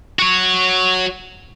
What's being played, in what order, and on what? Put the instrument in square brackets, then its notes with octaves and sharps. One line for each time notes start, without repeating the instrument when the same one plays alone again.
[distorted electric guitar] F#4 C#5